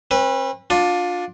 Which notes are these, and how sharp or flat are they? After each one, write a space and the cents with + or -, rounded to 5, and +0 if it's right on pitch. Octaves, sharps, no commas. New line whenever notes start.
C4 +45 B4 -15
D4 +0 F4 +25